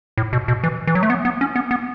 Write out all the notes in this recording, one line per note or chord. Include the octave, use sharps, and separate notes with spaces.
A2
B2
B2
E3
E3
F#3
A3
B3
B3
C#4
B3
B3